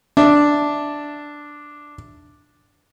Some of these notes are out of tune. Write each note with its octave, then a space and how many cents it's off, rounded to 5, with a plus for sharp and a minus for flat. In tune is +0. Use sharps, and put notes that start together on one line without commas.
D4 +0 E5 +0